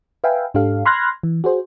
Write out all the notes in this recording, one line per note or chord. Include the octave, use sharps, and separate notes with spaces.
B4 E5 F5 G5 G#5
G#2 D4 G4 A4 F5
B5 C6 F6 F#6 G#6 A#6
E3
F#4 G#4 C5